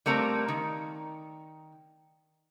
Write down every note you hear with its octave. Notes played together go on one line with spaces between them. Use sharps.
G3 A3 A#3 C4
D#3